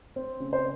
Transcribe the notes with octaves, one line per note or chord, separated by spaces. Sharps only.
C4
C#3
C5